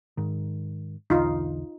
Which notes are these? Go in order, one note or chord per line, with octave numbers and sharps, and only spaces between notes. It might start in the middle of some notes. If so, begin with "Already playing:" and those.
G#2 D#3
B1 E2 D3 D#4 F4